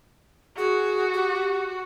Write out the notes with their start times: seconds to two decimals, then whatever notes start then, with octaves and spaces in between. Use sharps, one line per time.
0.58 F#4 G#4
1.14 G4